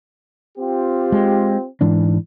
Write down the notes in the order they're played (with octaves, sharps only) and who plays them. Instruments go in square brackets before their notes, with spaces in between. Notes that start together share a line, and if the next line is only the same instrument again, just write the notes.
[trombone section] C4 F4 G4
[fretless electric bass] G#3
G#2 E3 D4